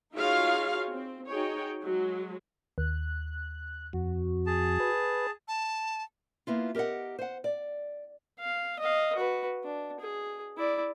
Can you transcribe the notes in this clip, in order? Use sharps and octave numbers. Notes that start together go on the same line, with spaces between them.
D#4 F4 F#4 G#4 C#5 F5
C4
D#4 F#4 G#4 C#5 G5
F#3 G#3
D#2 F#6
F2 F#4
G#4 A5
B4
A5
A#3 B3 E4 F4
G4 A#4 D5 D#5 F#5
C5 F#5
D5
F5
D#5 F5
F#4 B4
D4
G#4
E4 D5